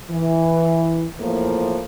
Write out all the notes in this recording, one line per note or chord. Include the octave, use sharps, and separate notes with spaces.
E3
E2 A2 F3 A#3